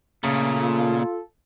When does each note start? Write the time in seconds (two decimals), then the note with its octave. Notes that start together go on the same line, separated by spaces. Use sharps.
0.24 A#2 C#3 A3
0.56 F4 A4